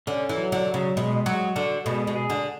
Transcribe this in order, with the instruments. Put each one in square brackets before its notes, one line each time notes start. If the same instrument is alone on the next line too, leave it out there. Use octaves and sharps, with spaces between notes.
[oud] D3 [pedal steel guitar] C#4
[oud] E3
[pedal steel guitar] F#3
[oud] D3
[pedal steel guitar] F#3
[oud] C#3
[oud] B2 [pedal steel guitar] G#3
[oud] F#3 [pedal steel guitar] F#4
[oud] D3 [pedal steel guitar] A4
[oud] B2 [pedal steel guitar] G#3
[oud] B2
[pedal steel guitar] G#4
[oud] D3